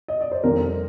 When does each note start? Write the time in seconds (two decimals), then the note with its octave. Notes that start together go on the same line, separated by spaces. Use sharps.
0.08 D#5
0.21 D5
0.31 C5
0.44 F2 C3 D#3 G3 A#4